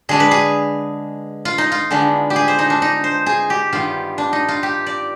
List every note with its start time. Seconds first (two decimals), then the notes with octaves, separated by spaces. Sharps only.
0.09 D3 G#3 D4 G#4
0.20 B4
0.31 G#4
1.45 F4
1.58 D#4
1.72 F4
1.90 D3 G#3 B3 D4
2.30 G4
2.36 G#4
2.48 C5
2.59 D#4
2.70 D4
2.82 D#4
3.04 C5
3.26 G#4
3.50 G4
3.73 G2 D#3 B3 F4
4.18 D4
4.33 D#4
4.48 F4
4.63 G4
4.86 D5